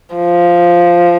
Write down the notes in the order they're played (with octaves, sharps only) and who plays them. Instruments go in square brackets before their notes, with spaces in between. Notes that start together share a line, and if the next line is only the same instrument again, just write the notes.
[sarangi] F3